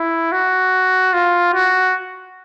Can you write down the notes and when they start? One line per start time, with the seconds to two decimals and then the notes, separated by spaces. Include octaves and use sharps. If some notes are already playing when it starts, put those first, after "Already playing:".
Already playing: E4
0.32 F#4
1.13 F4
1.54 F#4